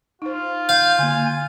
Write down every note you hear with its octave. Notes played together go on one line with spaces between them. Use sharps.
D#4 F4 C5
F5 G6
D3 A#3 G#5